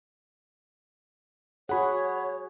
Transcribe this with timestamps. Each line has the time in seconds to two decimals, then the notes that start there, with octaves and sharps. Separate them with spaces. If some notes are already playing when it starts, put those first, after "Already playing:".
1.69 F#4 G#4 C#5 F#5 B5